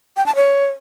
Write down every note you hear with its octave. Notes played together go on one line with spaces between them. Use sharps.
G5
A5
C#5